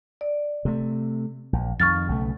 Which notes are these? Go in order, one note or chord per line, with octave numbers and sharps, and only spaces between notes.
D5
C3 A3
A#1
F2 D#3 C#6 F6 A6
B1 C#3 A3